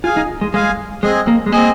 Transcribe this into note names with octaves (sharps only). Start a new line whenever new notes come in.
F4 G#4 F5 G#5
D#4
G#3
G#3 G#4 F5 G#5
G#3 C4 G#4 D#5 G#5
A#3
G#3
A#3 C4 G#4 D#5 G#5